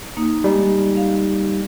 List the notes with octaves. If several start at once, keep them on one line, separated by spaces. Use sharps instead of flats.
A#3 D#4
G3 G#3 D#4
F5